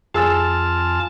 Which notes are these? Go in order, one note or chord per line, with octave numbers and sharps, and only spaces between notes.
F2 F4 G#4 A5 E6 A6